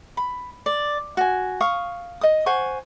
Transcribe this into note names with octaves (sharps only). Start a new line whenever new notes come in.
B5
D5
F#4 G#5
F5 C#6 D#6
D#5 D#6
C5 F#5 G#5 C#6